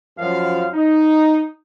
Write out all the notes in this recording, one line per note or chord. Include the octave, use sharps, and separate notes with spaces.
F#2 F3 F5
D#4